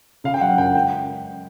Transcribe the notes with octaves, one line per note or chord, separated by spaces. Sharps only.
C#3 F5
G5
F#3 F#5
F#2 G5
G#3 G5